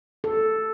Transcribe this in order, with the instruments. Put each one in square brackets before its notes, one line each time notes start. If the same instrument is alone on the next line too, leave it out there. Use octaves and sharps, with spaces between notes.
[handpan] A4